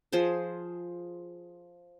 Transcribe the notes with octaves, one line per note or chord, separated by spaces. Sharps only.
F3 G#4 C5